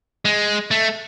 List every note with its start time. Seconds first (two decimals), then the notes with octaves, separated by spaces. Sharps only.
0.25 G#3
0.71 A3